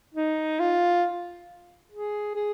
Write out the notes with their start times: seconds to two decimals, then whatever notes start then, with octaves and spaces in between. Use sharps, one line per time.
0.15 D#4
0.59 F4
1.92 G#4
2.35 G#4